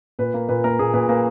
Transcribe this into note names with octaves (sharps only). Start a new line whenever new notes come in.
A#2 B4
A#3
A#2 B4
A#3 A#4
A#2 G#4
A#2 B4
A#3 B4